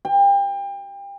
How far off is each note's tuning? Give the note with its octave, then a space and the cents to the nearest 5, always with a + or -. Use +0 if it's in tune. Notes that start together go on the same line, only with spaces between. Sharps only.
G5 +30